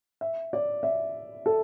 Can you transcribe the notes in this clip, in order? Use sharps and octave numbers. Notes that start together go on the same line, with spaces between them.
E5
D5
E5
A4